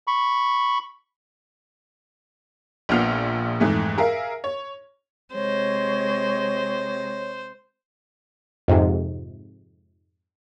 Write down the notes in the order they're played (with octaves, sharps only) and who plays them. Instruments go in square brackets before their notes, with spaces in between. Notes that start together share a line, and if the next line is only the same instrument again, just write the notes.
[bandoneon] B5 C#6
[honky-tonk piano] A#1 A#2 B3 F6 C7 F7
F2 G#2 E3 A3
G#4 A#4 E5 F5
C#5
[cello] C3 G#3 [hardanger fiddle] C5 [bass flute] C#5
[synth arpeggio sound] F2 G#2 C3